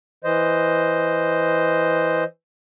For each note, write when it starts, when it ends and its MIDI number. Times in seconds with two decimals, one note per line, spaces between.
0.24 2.24 52
0.24 2.24 72
0.24 2.24 75